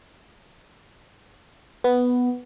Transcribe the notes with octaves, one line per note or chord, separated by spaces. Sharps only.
B3